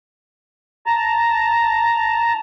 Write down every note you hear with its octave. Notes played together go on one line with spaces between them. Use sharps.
A5 A#5